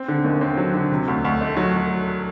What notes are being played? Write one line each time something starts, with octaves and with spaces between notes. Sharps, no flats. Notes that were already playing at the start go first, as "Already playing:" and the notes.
Already playing: C4
D3
D#2
C4
F#3
D3
C3
D2
D2
A3
F#3